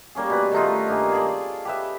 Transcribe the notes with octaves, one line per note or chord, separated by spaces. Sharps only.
G3 A#3 C#4 G#4
B2 B4
D#3 A3 D#4 F4
G2 A#3 G#5
G#4 A4 D5
G4 B4 E5